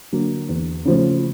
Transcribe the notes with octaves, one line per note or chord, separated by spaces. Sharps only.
D3 F#3 A#3
E2
C#3 F3 A3